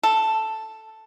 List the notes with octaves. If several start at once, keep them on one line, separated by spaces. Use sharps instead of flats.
A4